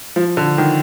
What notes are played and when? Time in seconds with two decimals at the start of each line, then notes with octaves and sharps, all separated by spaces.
0.16 F3
0.37 D3
0.58 D#3